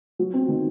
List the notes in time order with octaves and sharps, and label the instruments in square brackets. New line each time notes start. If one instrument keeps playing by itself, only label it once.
[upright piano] F#3
C4
D#3